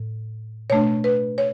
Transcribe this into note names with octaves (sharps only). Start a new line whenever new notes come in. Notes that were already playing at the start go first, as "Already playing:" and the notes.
Already playing: A2
B2 A3 D4 C#5
B4
C#5